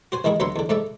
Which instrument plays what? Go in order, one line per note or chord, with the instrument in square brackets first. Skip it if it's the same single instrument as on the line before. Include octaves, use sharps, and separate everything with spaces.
[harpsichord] F#4 C5 G#5
A1 D#3 G#3 E4 G#4
D2 F#3 B3 E5 C6
E2 D3
G#2 A3 D5 E5